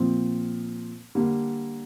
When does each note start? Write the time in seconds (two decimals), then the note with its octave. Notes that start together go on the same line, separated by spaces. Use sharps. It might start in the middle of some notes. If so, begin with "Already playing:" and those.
Already playing: A#2 F3 C4
1.15 D3 G3 A#3